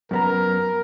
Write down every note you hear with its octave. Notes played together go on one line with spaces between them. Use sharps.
F#2 B3 A#4 A#5